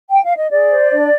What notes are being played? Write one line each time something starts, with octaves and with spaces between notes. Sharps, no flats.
G5
F5
D#5
G#4 D5
C5
D4